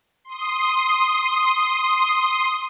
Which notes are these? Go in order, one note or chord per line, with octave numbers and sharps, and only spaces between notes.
C6 D#6